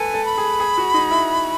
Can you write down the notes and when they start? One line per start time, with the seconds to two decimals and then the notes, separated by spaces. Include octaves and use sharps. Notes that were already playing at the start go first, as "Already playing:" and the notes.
Already playing: A4 B4 G#5
0.14 A4
0.25 B5
0.38 G#4
0.60 G#4
0.78 F#4
0.94 D#4
1.11 E4